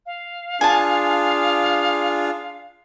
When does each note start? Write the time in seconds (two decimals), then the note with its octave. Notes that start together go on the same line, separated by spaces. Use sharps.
0.06 F5
0.61 D4 F4 G#4 G#5 A5